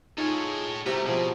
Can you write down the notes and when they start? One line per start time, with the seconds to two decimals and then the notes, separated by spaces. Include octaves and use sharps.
0.18 D#4 F4 G#4 A4 C#5
0.86 C3 G3 A3 B3 E4 A#5
1.06 B2 F3 G#4